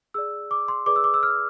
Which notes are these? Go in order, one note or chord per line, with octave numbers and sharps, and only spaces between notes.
G#4 D5 E6
D6
C6
G#4 B4 D5 D6
E6
D6
E6
F6